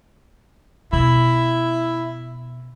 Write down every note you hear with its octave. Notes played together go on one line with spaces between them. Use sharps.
B2 E4